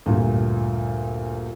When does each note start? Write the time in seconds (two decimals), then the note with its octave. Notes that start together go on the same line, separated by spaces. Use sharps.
0.06 D2 G2 A#2